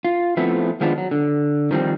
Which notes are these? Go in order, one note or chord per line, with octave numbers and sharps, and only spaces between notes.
F4
F3 A3 B3 C4 E4
D#3 F3 G#3 B3 D4 F4
F#3
D3
D#3 F3 G3 C4